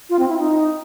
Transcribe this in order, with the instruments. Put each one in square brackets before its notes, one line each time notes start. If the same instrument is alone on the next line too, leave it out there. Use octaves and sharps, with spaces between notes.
[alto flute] F4
C4
E4
D#4